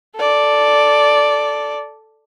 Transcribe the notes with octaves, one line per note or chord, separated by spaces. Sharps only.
A4 D5